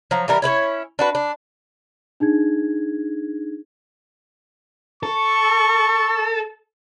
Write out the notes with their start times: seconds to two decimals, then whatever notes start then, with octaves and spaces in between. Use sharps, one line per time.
0.11 F3 F#3 A#5
0.28 E3 G3 A#4
0.42 C#4 E4 B4 C#5
0.99 D4 F#4 B4
1.15 D4
2.20 D4 D#4 G#4 G#6
5.03 A4 C#6